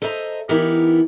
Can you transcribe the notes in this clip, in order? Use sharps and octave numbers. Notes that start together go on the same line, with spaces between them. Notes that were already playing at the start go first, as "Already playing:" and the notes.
A4 C5 D#5 E5 A#5
E3 B3 D#4 E4 G4 A#4